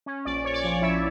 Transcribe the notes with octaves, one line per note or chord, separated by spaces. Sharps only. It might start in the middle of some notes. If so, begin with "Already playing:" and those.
C#4
A#1 D5
C#4 C#5
D5
F3 C#5
D5
F3 E4 E5